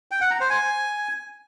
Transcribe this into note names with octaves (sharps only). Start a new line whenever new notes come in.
G5
F#5
A#5
C5
G#5